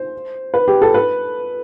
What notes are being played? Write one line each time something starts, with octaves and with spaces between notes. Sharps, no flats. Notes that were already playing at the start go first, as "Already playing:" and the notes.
Already playing: C5
B4
G4
A4
B4